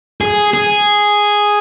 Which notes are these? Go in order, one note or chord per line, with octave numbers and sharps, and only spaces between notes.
G#4
G#4